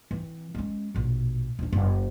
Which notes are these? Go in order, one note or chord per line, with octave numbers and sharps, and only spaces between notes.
E3 C4
G#3 C#4
A#1 B2
D#1 D4
F#1